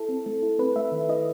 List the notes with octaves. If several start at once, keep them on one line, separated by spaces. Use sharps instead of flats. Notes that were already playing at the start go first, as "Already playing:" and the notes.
Already playing: E4 A4
C4
A3
E4
C4 B4
A3 E5
D#3
E4 D#5